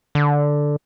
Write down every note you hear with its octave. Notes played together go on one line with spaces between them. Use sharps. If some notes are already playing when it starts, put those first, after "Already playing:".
D3